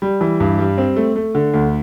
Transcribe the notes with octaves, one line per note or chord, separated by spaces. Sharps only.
G3
E3
G2
G3
C4
A3
A3
D3
D2